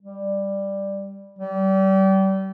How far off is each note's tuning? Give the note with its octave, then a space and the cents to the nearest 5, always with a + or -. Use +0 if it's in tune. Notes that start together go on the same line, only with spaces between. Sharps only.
G3 +5
G3 -30